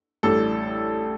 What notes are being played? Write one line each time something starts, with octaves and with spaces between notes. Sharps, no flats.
A1 A2 G3 D4 A4